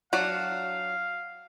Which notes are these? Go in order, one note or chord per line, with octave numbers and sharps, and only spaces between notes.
F#3 D4 D5 F5 F#5